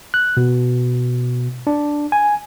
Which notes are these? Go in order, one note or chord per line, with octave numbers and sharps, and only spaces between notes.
F#6
B2
D4
G#5